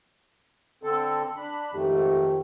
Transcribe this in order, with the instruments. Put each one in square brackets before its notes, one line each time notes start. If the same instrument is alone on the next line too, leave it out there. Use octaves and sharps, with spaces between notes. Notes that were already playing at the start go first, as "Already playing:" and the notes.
[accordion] D3 C4 A4
D4 B5
[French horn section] F2 D#3 G4 [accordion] G#2 A3